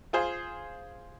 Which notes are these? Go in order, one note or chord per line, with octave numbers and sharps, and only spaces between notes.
F4 G#4 C5